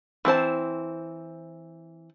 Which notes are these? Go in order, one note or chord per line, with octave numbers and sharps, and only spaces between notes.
E3 C4 C5 A5